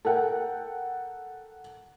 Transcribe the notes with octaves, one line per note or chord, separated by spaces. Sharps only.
A4 A#4 F#5 G5